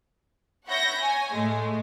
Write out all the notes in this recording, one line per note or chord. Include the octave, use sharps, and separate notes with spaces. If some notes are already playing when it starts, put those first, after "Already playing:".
C#5 E5 F#5 B5 G6 A#6
C#5 G#5
A2 G#3 A3